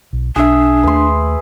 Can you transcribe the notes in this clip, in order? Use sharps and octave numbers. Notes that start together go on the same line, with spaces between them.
B1
B1 D4 G#4 E5
D#2 A3 B4 C6